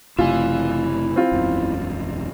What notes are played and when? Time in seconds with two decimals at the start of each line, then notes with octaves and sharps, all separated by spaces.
0.19 F#1 C3 A3 E4 F4 G#5
1.16 C4 F4
1.32 E1 B1 F#2